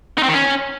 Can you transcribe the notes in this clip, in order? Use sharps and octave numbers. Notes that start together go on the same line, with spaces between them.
D#4
C4
D#3
C#4